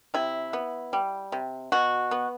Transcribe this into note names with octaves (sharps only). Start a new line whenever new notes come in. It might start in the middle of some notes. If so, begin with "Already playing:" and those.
C3 E4
B3
G3
C3
B2 F#4
B3